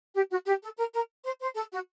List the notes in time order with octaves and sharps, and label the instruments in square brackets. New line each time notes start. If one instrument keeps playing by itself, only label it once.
[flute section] G4
F#4
G4
A4
A#4
A#4
C5
C5
A4
F#4